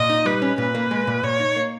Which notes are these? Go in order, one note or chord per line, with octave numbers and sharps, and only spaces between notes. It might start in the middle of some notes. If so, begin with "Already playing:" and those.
Already playing: A#2 D#5
D#4
G3 B4
C#4
A#2 B4
A#3
G#3
A#2
A#2 C#5
D#4
A#3